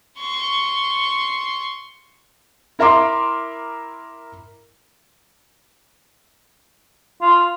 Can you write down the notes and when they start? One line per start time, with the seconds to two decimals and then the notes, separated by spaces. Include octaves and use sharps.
0.19 C6 C#6
2.79 E4 A#4 E5 A#5 C6 D6
7.21 F4